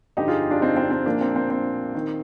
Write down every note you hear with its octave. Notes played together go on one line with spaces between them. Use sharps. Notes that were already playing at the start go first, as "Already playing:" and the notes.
G1 F2 D3 D#4 G4
F4 G#4
D4 F4
C4 D#4
C4 D#4
C4
A#1 A#2 F3 A#3 D4
C4
C4
C4
D#3